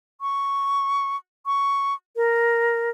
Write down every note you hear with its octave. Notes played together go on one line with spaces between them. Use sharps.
C#6
C#6
A#4